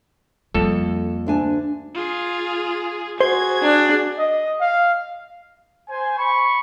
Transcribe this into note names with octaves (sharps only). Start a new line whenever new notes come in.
F2 G3 A#3 A4
D2 D4 G#5
F4 G#4
F#4 G#4 C5 G#6
D4
D#5
F5
C5 G#5
B5 C#6